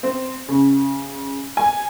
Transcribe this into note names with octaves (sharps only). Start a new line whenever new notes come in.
C4
C#3
G#5